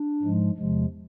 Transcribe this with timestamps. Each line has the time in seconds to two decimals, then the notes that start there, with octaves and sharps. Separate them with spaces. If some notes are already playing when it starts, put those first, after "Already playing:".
Already playing: D4
0.22 G#2 F3 G#3
0.57 E2 C3 F3 G#3